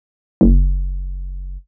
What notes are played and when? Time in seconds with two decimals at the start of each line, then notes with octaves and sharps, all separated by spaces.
0.41 F#1